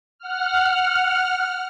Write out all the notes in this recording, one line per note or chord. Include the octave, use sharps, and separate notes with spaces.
F#5 F6